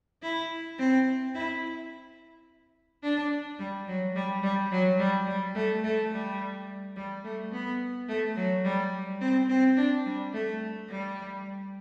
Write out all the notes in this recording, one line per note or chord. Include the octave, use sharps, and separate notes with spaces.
E4
C4
E4
D4
G3
F#3
G3
G3
F#3
G3
G3
A3
A3
G3
G3
A3
B3
A3
F#3
G3
C4
C4
D4
G3
A3
G3